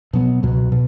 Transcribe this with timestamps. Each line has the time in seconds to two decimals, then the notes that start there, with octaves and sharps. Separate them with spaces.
0.13 B2 F#3 B3
0.43 C#2 B2 F#3
0.72 B2